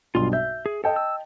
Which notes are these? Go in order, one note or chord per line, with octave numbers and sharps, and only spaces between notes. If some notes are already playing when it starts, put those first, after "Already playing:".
B1 G2 F4 C6
E5 G6
G#4
A4 D#5 G5 A5
E6